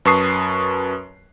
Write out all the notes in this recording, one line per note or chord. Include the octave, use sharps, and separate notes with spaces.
F#2 B4 A5 C#6 D#6 C7